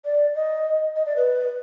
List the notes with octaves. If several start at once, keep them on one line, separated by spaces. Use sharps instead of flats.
D5
D#5
D#5
D5
B4